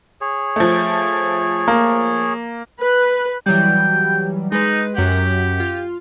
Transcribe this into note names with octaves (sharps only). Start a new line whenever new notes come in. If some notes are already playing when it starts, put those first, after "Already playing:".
G#4 C#5
F3 A3
A#3
B4
E3 F#3 G3 G5
G#3 D#4 B4
F#2 G4 F#5 B6
F4